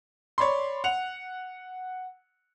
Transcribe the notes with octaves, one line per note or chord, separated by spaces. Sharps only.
C#5 D5 B5 C6
F#5 F7